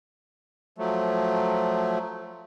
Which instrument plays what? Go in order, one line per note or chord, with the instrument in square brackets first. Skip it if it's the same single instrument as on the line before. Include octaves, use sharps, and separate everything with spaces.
[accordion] F3 F#3 A3